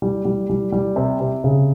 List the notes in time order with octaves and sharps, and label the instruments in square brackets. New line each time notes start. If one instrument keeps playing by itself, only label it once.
[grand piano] G3
G3
G3
G3
C3
C3
C#3